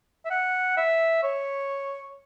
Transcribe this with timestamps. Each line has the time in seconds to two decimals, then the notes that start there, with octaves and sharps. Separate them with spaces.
0.25 E5
0.30 F#5
0.77 E5
1.23 C#5